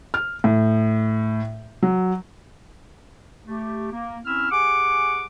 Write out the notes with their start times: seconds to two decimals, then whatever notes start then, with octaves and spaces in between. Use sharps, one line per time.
0.14 F6
0.44 A2
1.82 F#3
3.47 A3 G4
3.92 A#3
4.25 C4 C#4 E4 E6 F6
4.51 G4 G#4 F#5 G#5 C#6 D6